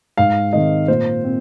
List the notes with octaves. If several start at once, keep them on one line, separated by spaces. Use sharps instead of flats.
G#2 F5
D#3 G#3 C4 D#5
A#2 C5
C4